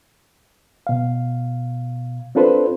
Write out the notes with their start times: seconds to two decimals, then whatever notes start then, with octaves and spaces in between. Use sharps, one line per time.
0.87 B2 F5
2.35 C4 D4 F4 A4 B4 C5